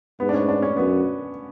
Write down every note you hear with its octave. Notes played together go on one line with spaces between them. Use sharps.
G#2 B3
D4
C#4
D4
C#4
F#2 B3